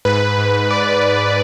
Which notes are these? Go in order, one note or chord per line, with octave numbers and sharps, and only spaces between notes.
G#2 B4
G#2
G#2
G#2
D5